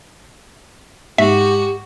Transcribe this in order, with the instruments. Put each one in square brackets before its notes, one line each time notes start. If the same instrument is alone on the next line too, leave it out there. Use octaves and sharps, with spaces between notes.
[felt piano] G#2 [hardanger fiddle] F#4 [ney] G4 [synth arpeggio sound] E5